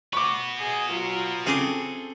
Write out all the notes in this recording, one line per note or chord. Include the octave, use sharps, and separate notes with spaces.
F#4 B4 C#6 D6
G#4 D#5
F#3 F4 A#4
C#3 C4 G#4 A4 D6